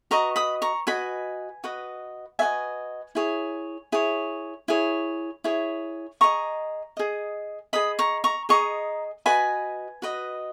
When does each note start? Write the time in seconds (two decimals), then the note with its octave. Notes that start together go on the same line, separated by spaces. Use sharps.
0.11 F#4 B4 D#5 A#5 C#6
0.36 B5 D#6
0.62 A#5 C#6
0.87 F#4 B4 D#5 G#5 B5
1.64 F#4 B4 D#5
2.39 F#4 B4 D#5 E5 G#5
3.15 E4 G#4 C#5
3.92 E4 G#4 C#5
4.68 E4 G#4 C#5
5.44 E4 G#4 C#5
6.21 G#4 D#5 A#5 C#6
6.97 G#4 D#5
7.73 G#4 D#5 B5 D#6
7.99 A#5 C#6
8.24 A#5 C#6
8.49 G#4 D#5 A#5 C#6
9.26 F#4 B4 D#5 G#5 B5
10.02 F#4 B4 D#5